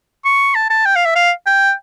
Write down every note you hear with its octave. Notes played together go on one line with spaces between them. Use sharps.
C#6
A5
A5
G5
F5
E5
F5
G5